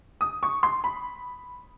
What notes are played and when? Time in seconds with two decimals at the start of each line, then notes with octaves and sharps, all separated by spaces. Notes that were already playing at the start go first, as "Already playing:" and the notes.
0.21 D#6
0.43 C#6
0.63 C6
0.84 B5